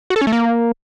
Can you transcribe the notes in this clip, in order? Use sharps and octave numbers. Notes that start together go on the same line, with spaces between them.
F#4
A4
C#4
A3
A#3